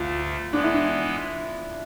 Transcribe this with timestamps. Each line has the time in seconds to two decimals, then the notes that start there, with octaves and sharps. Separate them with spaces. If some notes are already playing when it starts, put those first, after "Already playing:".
Already playing: D2 D3 A3 F4
0.52 E3 G#3 B3 D4
0.63 E4
0.74 D4